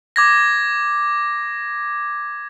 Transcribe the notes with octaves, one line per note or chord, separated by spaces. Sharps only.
D6 G#6 A#6